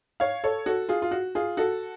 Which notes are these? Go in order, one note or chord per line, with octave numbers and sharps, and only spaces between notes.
C#5 F5
A4 C#5
F#4 A4
F4 G#4
F4
F#4
F4 G#4
F#4 A4